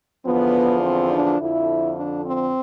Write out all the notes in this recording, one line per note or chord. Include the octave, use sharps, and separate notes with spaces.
E2 D3 F3 B3
C4
D4
F2 D3 F3 E4
D4
C4